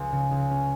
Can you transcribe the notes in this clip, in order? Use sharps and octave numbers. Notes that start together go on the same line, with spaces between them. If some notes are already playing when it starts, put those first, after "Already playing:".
Already playing: C#2
C#3
C#2
C#4